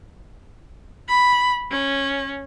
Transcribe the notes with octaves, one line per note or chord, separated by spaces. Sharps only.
B5
C#4